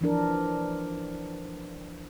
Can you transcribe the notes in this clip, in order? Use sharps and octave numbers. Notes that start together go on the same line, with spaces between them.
E3 F3 D4 A#4